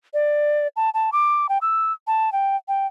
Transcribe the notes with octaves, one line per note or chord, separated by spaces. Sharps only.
D5
A5
A5
D6
G5
E6
A5
G5
G5